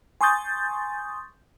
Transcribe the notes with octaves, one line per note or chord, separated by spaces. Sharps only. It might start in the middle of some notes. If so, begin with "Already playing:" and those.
G#5 C6 C#6 D#6 G6 A6